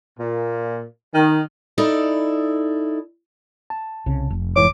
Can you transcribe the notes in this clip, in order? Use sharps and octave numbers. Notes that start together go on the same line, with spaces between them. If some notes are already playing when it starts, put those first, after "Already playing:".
A#2
D#3
D#4 E4 A4 D5
A5
C2 C#3
F1
G#2 E3 C#5 D6